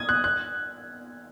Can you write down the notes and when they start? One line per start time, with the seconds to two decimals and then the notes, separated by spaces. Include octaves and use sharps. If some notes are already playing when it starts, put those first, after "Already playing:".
Already playing: D#6 G#6
0.09 F#6
0.24 F#6